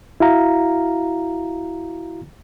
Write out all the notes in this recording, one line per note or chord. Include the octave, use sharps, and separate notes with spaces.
E4 F#4 F5 A#5